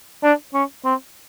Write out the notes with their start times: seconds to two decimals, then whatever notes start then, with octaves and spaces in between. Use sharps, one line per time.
0.23 D4
0.54 C#4
0.85 C4